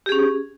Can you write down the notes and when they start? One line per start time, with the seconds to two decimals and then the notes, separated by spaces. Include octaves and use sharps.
0.06 G4
0.09 G#4
0.12 C#4